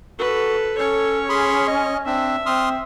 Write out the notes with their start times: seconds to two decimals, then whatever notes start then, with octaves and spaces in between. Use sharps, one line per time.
0.19 F#4 A4 B4
0.78 C#4 A4 C#5
1.29 G#4 B5 C6
1.67 D#5
2.06 C4 D4 E5
2.46 C4 C6 D#6 F6